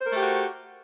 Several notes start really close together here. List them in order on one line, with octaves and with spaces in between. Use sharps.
C5 A#4 A3 G4 F#4